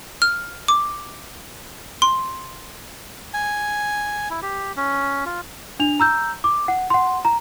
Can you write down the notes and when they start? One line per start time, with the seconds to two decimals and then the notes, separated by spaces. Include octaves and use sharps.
0.22 F6
0.68 D6
2.02 C6
3.34 G#5
4.30 E4
4.42 G4
4.77 C#4
5.26 F4
5.80 D4 F7
6.00 A#5 E6 G6
6.44 D6
6.68 F#5
6.90 F#5 C6
7.25 A#5